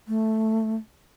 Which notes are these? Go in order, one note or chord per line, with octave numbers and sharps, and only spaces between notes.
A3